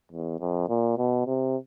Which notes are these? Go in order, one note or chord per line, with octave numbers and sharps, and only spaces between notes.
E2
F2
A#2
B2
C3